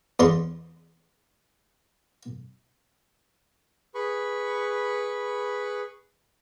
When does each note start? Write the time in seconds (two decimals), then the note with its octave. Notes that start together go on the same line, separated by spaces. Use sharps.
0.20 E2 C6 C#6
3.95 G#4 B4 B5 C#6